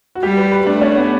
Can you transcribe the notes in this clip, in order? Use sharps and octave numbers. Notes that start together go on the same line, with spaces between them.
F#4
G3 G4
B4
B4
A3 D4
C#4
B3